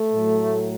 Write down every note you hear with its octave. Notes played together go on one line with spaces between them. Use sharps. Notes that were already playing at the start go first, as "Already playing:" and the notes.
Already playing: A3
A2 F#3